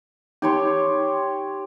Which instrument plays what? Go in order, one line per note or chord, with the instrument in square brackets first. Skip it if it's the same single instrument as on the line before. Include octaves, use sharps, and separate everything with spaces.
[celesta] D#4 [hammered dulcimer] G4 C#5 C6